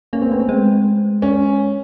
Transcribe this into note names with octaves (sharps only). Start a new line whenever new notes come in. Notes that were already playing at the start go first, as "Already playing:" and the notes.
A#3 C#4
C4
A3 B3
C4
G#3
C#4